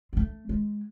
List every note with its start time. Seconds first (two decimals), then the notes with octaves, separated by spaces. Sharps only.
0.13 G#3
0.17 A3
0.49 G#3